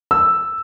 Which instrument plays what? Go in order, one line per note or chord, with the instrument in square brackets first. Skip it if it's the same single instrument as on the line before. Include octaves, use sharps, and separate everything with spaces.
[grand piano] E6